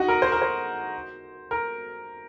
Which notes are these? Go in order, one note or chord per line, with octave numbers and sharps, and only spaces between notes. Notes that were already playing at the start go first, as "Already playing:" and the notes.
Already playing: D#4 F#4
A#4
C5
A#4
C5
A#4